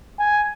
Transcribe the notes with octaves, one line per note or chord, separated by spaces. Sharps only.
G#5